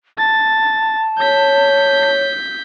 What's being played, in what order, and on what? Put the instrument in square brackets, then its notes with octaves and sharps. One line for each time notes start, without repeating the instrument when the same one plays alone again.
[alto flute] A5 [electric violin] A6
[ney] C#5 [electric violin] G6 B6